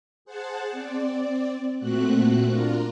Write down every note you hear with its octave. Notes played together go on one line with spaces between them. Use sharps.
G#4 C5 F#5 A5
C4 D5
A#2 A3 C4 F#4 F#6
D4 F4 A#4